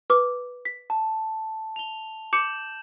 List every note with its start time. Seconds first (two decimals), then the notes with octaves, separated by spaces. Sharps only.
0.10 B4 D6
0.65 B6
0.90 A5
1.76 F7 G7
2.33 D6 G6 C#7 E7 F#7